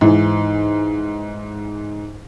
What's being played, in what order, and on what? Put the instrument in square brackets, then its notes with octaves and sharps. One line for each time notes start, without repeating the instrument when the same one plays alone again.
[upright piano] G#2 E3